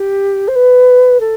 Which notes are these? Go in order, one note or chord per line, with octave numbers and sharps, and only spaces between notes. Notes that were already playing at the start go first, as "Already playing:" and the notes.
Already playing: G4
C5
B4
A4